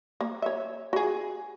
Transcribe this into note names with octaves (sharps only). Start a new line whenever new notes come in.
A#3
C#5 E5
F#4 G#4